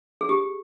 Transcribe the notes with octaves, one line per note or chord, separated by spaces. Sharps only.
G#4
G4